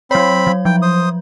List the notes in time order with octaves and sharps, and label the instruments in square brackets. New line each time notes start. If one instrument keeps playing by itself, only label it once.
[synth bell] F#3 C#5 [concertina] C4 B5
[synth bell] F#3
[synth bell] F3 [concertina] G5
[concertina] C5 D#6